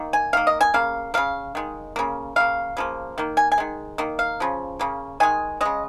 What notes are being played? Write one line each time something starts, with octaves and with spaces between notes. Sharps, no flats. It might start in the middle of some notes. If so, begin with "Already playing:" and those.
Already playing: D#3 A#3
G#5
D#3 A#3 F5
D#5
G#5
C#3 A#3 F5
C#3 A#3 F5
D#3 G#3
C#3 A#3
C#3 A#3 F5
C#3 F3 A#3
D#3 A#3
G#5
G#5
D#3 G#3
D#3 A#3
F5
C#3 F3
C#3 A#3
D#3 G#3 G#5
C#3 G#3 D#5